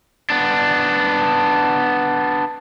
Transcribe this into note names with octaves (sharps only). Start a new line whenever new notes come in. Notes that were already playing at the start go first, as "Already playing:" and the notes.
B3 D4